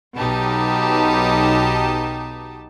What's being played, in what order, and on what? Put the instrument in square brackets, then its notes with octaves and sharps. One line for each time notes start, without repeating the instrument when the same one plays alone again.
[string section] B1 B2 D#4 G4 A5